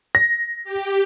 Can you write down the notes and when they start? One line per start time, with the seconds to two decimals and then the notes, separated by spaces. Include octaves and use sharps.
0.15 A#6
0.64 G4